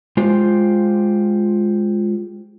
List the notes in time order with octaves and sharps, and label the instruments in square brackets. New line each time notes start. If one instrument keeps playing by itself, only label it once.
[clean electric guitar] G#3 F4 G4 C5